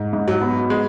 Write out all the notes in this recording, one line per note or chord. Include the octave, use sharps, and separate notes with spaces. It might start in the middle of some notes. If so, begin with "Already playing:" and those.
Already playing: G#2
G#2
F#3
B3
G#3